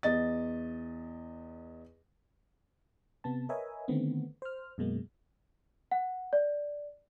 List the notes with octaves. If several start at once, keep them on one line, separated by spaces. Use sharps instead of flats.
E2 D#5 A6
C3 B3 A5
A#4 B4 C#5 D#5 E5 G#5
D3 D#3 A3 B3 C4
C5 F6
F#2 B2 G#3 A#3
F#5
D5